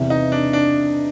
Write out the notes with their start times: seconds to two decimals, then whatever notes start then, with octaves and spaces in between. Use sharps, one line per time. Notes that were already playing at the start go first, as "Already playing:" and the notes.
Already playing: E2 C3 E3
0.10 D#4
0.32 D4
0.53 D4